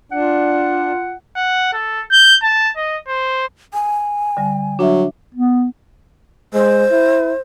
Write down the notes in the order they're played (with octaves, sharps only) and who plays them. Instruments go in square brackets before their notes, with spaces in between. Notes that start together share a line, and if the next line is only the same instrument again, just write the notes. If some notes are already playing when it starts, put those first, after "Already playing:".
[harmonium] D4 [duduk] F4 [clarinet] F#5
[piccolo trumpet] F#5
A4
G6
A5
D#5
C5
[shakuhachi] G#5
[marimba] D3 G3
[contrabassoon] F#3 [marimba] D4 E5
[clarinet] B3
[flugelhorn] G#3 [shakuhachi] C5
[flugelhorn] E4